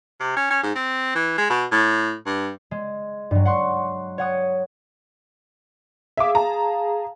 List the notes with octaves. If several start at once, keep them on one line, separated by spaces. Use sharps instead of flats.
C3
C#4
C#4
G#2
C4
E3
G#3
B2
A2
G2
G#3
G2 F#3
F#5 C6 C#6
C#5 F#5 D#6
G#4 E5 F5 D6
A5 A#5